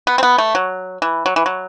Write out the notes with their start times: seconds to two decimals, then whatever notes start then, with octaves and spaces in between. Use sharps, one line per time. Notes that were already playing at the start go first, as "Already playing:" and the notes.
0.07 B3
0.18 C4
0.23 B3
0.38 A3
0.55 F#3
1.02 E3
1.26 F#3
1.36 E3
1.46 F#3